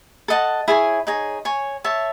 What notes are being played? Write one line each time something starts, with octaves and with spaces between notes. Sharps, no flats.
A4 D#5 F#5 A5
E4 G#4 C#5 G#5
D#4 G#4 C#5
C#5 G#5 C#6
C#5 E5 A5